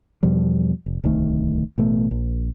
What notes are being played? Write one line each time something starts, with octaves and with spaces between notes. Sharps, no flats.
E2 B2 F3 G3
F1
D1 C2 D#3 A3
A1 B2 A3
A#1